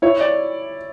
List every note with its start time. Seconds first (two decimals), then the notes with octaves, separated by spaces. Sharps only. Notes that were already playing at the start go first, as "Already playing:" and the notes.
0.02 E4 C#5
0.20 D5